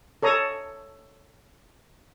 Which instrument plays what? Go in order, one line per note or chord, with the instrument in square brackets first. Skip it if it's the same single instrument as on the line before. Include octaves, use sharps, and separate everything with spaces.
[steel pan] A4 C#5 A#5 D#6